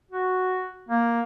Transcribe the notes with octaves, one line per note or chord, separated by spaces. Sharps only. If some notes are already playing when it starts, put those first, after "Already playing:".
F#4
A#3